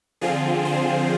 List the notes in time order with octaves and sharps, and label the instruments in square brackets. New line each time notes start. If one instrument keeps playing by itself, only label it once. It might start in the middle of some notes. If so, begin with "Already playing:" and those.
[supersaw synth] D3 F3 C4 F4 G#4
G#4 C5